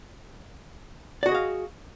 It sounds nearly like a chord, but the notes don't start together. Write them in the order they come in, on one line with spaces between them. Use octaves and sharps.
D5 F#4 D#5 G#4 F5